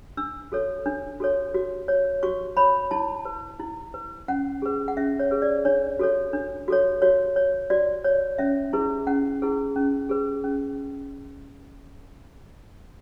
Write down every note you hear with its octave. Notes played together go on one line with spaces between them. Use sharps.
D4 E6
F#4 A4 C#5
D4
F#4 A4 C#5
F#4
C#5
F#4 C#6
C#5 B5
E4 A5
B4
E4
B4
C#4 F#5
G#4 B4
F#5
C#4 E5
C#5
G#4 B4
D5
D4 C#5
F#4 A4 C#5
D4
F#4 A4 C#5
F#4 C#5
C#5
F#4 D5
C#5
C#4 E5
E4 G#4 B4
C#4 F#5
E4 G#4 B4
C#4
G#4 B4
C#4